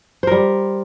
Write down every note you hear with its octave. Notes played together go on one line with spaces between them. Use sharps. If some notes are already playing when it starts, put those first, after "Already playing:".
G3 A#4 C5